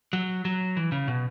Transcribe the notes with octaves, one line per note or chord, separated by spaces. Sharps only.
F#3
F#3
E3
C#3
B2